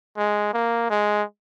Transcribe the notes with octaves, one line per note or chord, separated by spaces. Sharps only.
G#3
A#3
G#3